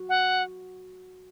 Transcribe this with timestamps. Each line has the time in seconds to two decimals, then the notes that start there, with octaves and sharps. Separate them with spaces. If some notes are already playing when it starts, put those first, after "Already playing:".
Already playing: F#4
0.09 F#5